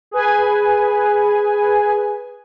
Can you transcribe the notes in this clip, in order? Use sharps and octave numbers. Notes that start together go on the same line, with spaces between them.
G#4 B4 G#5